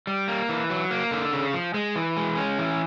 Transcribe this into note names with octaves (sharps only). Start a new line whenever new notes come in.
G3
A#3
E3
F#3
A#3
D3
C#3
F3
G#3
E3
G#3
C#4
E3